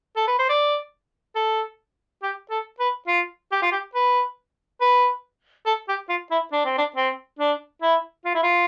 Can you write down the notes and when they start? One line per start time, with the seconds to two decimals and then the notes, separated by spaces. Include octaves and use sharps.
0.16 A4
0.27 B4
0.39 C5
0.49 D5
1.36 A4
2.23 G4
2.50 A4
2.80 B4
3.08 F4
3.52 G4
3.62 F4
3.72 G4
3.95 B4
4.81 B4
5.66 A4
5.89 G4
6.09 F4
6.31 E4
6.53 D4
6.65 C4
6.78 D4
6.96 C4
7.39 D4
7.82 E4
8.25 F4
8.35 E4
8.43 F4